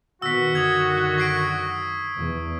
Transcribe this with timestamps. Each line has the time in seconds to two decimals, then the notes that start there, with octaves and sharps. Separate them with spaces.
0.22 A#2 D#3 B3 F#4 E6 B6
0.54 F#2 D3 D#3 D#6 G#6 B6
1.18 C#6 C7 D7
2.16 E2